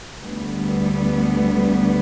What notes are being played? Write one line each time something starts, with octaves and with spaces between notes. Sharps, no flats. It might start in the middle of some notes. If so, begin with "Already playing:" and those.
D2 D3 G3 B3